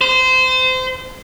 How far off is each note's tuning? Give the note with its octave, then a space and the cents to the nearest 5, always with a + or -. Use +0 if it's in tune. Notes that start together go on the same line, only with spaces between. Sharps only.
C5 -25